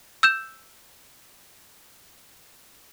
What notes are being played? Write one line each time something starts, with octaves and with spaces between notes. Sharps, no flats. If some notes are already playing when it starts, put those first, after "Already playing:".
E6 G6 E7